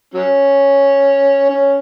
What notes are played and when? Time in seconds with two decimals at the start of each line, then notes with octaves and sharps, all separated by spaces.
0.14 F#3 C#4
1.50 C#4